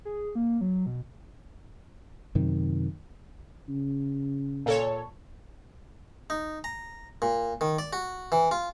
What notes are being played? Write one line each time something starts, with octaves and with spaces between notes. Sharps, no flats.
G#4
A#3
F#3
B2
F#2 C3 D#3
C#3
A#2 A4 C#5
D#4
A#5
A#2
D#3
D5
F#4
E3
F4